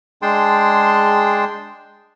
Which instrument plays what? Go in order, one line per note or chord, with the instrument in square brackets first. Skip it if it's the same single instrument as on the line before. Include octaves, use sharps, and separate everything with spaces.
[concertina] G#3 D4 G#4 G5 A5 C6